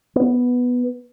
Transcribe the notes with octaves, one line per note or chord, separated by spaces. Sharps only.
B3